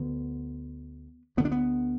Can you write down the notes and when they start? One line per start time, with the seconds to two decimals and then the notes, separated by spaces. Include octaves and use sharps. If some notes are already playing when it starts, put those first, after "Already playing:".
Already playing: D2 D3 B3
1.37 D2 D3 B3
1.45 D4
1.52 B3